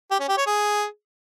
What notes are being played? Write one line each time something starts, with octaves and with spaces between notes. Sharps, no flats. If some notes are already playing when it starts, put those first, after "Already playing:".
G4
C#4
G4
C#5
G#4